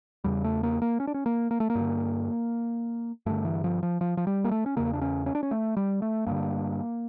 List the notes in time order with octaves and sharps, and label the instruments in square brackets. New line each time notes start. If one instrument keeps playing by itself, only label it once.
[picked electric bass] E2 C#3 G3
A3
A#3
A#3
C#4
D4
C#4
A#3
A#3
A3
A#3
G2
D3
G2 D3 A3
E3
F3
F3
F3
F3
G3
A#3
A3
C#4
E2 C#3 A#3
D4
C#4
C#4
D4
C#4
A3
G3
A3
G2 D3 A#3